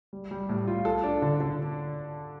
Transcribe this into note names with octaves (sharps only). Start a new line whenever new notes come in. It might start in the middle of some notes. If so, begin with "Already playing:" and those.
G3
G3
A2
F4
A4
D4
D3
D3